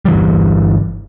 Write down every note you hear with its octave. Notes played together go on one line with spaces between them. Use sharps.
G1 E3 G3